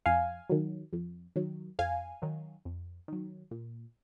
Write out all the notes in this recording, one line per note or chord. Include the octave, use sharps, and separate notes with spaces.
F2 F5 G#5
D#3 F#3
F2
D#3 F#3
F2 F5 G#5
D#3 F#3
F2
D#3 F#3
A#2